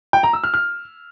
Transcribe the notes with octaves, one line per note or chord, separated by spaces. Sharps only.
G5
A#5
E6
F6
F6